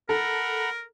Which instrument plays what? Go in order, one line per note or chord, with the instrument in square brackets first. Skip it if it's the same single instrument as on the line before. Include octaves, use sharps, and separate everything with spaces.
[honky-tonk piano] A4 [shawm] A#4 [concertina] F#5 A#5 B5